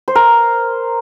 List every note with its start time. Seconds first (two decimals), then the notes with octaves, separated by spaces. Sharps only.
0.08 C5
0.15 A#4